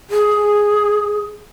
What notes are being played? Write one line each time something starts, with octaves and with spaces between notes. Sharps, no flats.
G#4